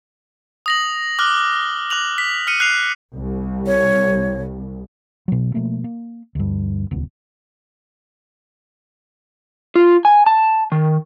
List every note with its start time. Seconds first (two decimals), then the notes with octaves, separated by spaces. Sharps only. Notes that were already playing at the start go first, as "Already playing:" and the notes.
0.66 D#6 A#6 F#7
1.19 D6 F6 F#6 G7
1.90 D6 F#6 F7 F#7
2.18 B6
2.47 F6 C#7 D#7
2.60 F#6 C7 F7
3.13 C2
3.67 C#5
5.28 B2 F#3
5.54 B2 F3 A3 A#3
5.84 A#3
6.35 D2 G2
6.91 D#1 C#2 B3
9.75 F4
10.05 G#5
10.26 A5
10.72 D#3